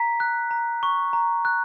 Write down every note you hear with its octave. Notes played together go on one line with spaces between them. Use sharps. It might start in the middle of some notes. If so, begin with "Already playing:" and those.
Already playing: A#5 B6
F#6
A#5
C#6
A#5
F#6